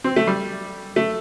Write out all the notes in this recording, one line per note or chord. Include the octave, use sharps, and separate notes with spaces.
C4
A3
G3
A3